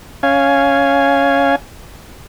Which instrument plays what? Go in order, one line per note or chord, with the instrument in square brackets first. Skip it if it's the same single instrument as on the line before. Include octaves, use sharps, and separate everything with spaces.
[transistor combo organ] C#4 F5 G#5